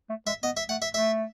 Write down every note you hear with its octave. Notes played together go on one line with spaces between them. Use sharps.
A3
G#3 E5
B3 D#5
E5
A3 F#5
E5
A3 E5